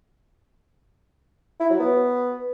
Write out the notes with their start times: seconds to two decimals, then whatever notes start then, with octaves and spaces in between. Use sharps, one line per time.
1.60 E4
1.70 F#3
1.80 B3